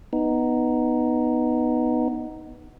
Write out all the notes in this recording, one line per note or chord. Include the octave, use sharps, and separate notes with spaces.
B3 D#4